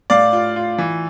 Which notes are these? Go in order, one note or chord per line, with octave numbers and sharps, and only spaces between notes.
A2 D5 F5
F4
F4
E3